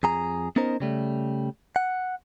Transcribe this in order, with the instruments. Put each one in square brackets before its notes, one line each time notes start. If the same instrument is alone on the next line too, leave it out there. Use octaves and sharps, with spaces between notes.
[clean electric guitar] F2 G#4 A#5
B3 C#4 D#4 A#4 C5 D#5
C#3 G3 A3
F#5